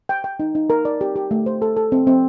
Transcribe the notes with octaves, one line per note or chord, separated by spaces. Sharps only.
G5
G5
D#4
D#4
A#4
D5
G4
G4
A3
C5
A4
A4
C4
C4